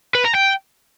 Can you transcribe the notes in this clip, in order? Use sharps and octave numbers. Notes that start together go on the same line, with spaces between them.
B4
A#5
G5